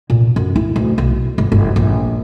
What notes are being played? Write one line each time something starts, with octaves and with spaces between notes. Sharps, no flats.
A#2
F#2
E4
D1
B1
G1
G1
A#1